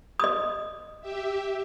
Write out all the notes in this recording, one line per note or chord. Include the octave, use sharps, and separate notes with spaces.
D#5 D#6
G4 E5